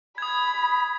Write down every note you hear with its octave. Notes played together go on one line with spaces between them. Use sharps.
B5 D#6 G#6